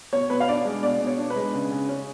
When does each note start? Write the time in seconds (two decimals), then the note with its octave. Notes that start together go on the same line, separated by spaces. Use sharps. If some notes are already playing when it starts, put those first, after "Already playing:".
0.13 B2 C#5
0.30 B2 B4
0.40 F5
0.48 D4 D5
0.65 G#3
0.83 B2 D5
1.01 B2
1.07 C#5
1.18 D4
1.30 B4
1.36 G#3
1.54 C#3
1.71 C#3
1.89 C#4